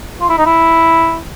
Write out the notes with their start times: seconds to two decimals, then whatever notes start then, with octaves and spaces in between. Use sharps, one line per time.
0.21 F4
0.29 E4
0.38 D#4
0.46 E4